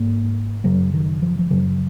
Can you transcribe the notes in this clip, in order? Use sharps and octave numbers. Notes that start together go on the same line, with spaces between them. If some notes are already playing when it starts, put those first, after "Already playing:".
Already playing: G#2 A#3
F#2 C#3 F#3
D#3
F3
F3
F#2 C#3 F#3